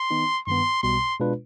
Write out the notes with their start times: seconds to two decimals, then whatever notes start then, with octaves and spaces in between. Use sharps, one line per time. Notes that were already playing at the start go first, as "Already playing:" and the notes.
Already playing: C6
0.11 D#3 B3 D#4
0.47 G2 D#3 B3 C6
0.83 B1 B2 G3 C6
1.19 B2 G#3 D4 F4 B4